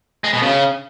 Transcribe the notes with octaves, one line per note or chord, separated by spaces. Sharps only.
G#3
B2
C#3